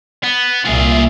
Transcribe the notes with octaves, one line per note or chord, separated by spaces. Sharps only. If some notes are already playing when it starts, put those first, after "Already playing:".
B3
C2 A#2 F4 G#4 E5